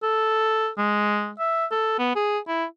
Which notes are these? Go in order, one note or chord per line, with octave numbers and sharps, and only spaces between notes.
A4
G#3
E5
A4
B3
G#4
E4